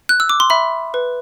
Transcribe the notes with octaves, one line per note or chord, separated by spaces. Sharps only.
F#6
E6
D6
C6
E5 B5
B4